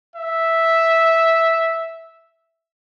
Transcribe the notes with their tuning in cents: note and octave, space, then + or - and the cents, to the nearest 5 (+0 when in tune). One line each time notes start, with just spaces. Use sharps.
E5 -5